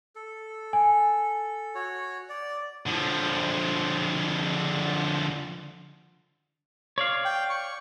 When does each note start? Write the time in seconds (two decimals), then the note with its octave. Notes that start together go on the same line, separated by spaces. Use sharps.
0.16 A4
0.73 G#5
1.75 F#4 C#5
2.29 D5
2.87 D3 F3
6.98 C#5 D5 F5
7.25 G5
7.50 C#6